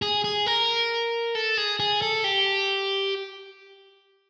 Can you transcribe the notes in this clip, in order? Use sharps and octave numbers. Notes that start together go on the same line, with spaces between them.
G#4
G#4
A#4
A4
G#4
G#4
A4
G4